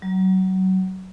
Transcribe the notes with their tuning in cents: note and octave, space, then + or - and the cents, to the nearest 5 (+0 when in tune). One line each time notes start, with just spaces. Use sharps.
F#3 +25